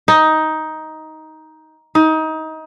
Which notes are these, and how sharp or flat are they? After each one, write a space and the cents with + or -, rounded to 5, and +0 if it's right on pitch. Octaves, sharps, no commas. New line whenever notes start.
D#4 +10
D#4 +25